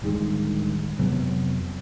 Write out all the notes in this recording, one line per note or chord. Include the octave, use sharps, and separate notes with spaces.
D1 G2 D#3 G#3
F2 C3 F#3 B3